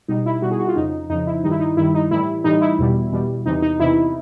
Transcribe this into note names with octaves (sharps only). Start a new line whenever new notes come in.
B2 G3 D#4
E4
B2 G3 F#4
G#4
F#4
F4
F2 C#3 F3 D#4
F2 C#3 F3 D#4
E4
G2 D#3 G3 D#4
E4
D#4
G2 D#3 G3 E4
D#4
A2 E3 G3 E4
A2 E3 G3 D#4
E4
E2 B2 G3
E2 B2 G3
E2 C3 E3 D#4
D#4
E2 C3 E3 E4